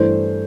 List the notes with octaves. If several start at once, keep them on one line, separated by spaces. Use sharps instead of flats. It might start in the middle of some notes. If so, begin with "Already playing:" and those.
Already playing: G2 E3 A3 C5